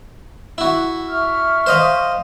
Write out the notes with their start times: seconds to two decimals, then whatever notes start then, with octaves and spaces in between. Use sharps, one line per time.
0.58 E4 F#4
1.09 E5 C#6 F6
1.66 C5 D#5 F5